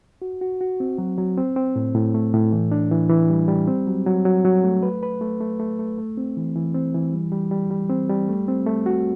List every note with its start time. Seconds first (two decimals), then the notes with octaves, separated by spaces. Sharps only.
0.22 F#4
0.41 F#4
0.61 F#4
0.80 C4
0.98 F#3
1.17 F#3
1.37 C4
1.56 C4
1.76 A2
1.95 A2
2.14 A3
2.34 A2
2.52 E3
2.72 D4
2.91 E3
3.10 E3
3.30 G3
3.48 G3
3.67 C4
3.87 F#3
4.06 F#3
4.25 F#3
4.45 F#3
4.64 A3
4.83 B4
5.03 B4
5.21 A3
5.41 A3
5.60 A3
5.79 A3
5.98 A3
6.17 C4
6.37 E3
6.56 E3
6.74 C4
6.94 E3
7.13 G3
7.32 G3
7.51 G3
7.71 G3
7.89 C4
8.09 G3
8.29 A3
8.48 C4
8.66 A3
8.86 F#4